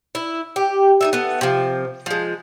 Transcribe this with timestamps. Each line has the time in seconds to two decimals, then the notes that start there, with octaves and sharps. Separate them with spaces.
0.15 E4
0.56 G4
1.01 D#4 A4 E5
1.13 A3 B3
1.41 C3 F3
2.06 F3 G#3